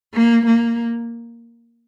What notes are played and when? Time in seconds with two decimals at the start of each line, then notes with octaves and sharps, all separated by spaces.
0.14 A#3
0.47 A#3